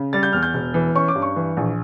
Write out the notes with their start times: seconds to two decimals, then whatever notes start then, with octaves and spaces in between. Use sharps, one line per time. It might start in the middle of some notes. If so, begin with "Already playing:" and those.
Already playing: C#3
0.13 G3 A6
0.23 G6
0.33 E2 F6
0.43 G6
0.54 E1
0.74 E3
0.95 C#4 C#6
1.08 D6
1.15 G2
1.22 C#6
1.36 E3
1.57 A#1